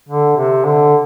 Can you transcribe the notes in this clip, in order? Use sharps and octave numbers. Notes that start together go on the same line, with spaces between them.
D3
C3
D3